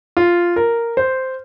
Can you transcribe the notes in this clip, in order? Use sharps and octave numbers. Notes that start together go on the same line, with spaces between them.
F4
A#4
C5